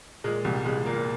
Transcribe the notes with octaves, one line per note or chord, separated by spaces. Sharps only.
A#2 G#3
C2 G3
C2 G#3
A#2 A#3